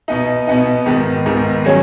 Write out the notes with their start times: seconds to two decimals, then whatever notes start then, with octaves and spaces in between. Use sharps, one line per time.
0.08 B2 B3 D#4
0.47 B2 B3 D#4
0.86 G#2 D#3 B3
1.26 G#2 D#3 B3
1.65 D#3 F#3 C#4 G#4 C#5